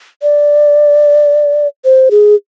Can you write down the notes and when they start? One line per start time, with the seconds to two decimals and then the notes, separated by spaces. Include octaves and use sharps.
0.22 D5
1.85 C5
2.11 G#4